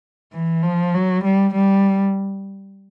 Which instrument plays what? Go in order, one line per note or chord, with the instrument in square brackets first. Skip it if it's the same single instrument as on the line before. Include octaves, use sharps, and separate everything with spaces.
[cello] E3
F3
F#3
G3
G3